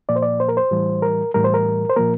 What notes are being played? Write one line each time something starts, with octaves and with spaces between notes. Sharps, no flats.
A#2 F3 A#3 D5
C5
D5
C5
A#4
C5
A2 E3 G3
A#4
A2 E3 G3 A#4
C5
A#4
C5
A#2 F3 A#3 A#4